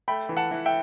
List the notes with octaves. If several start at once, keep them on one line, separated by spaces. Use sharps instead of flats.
A3 G5 B5
E3
F#5 A5
E3
E5 G5